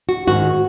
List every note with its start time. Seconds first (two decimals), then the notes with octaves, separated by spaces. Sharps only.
0.09 F#4
0.27 G#2 D#3 F#4